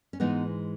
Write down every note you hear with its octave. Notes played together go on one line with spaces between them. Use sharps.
C#4
G#2 E3 G#3 B3 D#4